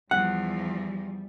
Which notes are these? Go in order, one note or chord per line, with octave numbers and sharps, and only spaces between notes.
E2 F3 G3 F#5